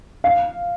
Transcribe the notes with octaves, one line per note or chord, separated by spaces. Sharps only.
F5